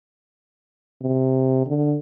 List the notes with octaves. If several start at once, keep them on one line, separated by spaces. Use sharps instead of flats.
C3
D3